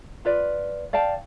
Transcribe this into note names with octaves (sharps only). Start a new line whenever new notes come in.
F4 B4 D5
D5 F5 G5 A5